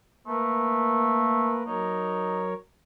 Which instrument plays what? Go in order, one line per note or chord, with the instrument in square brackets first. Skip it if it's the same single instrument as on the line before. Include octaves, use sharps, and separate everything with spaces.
[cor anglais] A3 [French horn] A#3 [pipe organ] A#4 B4
[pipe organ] F#3 A#4 C#5 [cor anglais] D#4